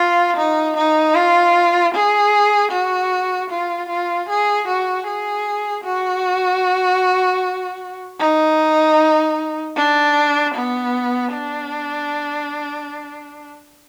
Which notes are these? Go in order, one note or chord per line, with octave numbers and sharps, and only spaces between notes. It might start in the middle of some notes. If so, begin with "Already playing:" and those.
Already playing: F4
D#4
D#4
F4
G#4
F#4
F4
F4
G#4
F#4
G#4
F#4
D#4
D4
B3
D4